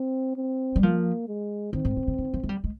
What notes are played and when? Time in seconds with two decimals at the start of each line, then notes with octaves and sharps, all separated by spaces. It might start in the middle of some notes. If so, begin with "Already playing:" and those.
Already playing: C4
0.37 C4
0.76 G3
0.82 F3 A#3
1.28 G#3
1.73 D#3 C4
1.85 G#2
1.97 C#3
2.08 C#3
2.18 D#3
2.34 F3
2.43 G#3
2.49 G3
2.64 G#3